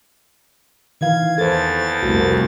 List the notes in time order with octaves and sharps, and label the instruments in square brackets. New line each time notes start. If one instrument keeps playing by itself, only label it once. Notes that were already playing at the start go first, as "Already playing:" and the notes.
[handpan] D#3 E3 F5 [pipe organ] G#6
[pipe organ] E2 A6 [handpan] A4 C5
[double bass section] C2 F2 A3 [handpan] F#4